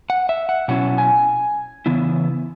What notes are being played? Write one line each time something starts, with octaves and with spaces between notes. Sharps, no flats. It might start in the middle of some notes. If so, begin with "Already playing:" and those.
F#5
E5
F#5
B2 F#3 C#4 E4 F#5
G#5
C#3 E3 B3 E4